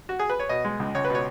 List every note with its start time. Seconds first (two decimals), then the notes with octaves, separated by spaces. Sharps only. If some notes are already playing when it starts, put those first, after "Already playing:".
0.09 F#4
0.19 G#4
0.30 B4
0.40 C#5
0.49 B2 D#5
0.65 G#3
0.80 C#2
0.95 C#2 C#5
1.05 B4
1.10 B2 C#5